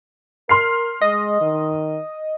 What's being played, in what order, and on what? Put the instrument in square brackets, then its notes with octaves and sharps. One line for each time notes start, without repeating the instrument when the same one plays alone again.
[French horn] A#4 [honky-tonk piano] C6 F6 C7
[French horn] G#3 [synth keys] D#5
[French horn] D#3